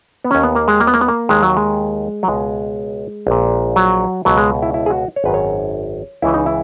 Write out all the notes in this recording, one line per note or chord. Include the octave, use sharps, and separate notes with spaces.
B3
D#2 D#3 C#4
B3
A#3
G#3
A#3
B3
A#3
B3
A#3
D#2 D#3 G#3
F#3
G#3
F#3
C#2 B2 G#3
A#1 A#2
F#3
C#2 B2 F#3
G#3
E4
E4
G#4
F#4
C#5
G#1 F#2 D#3 B4
C#5
C#2 C#3 E3 E4
D#4
E4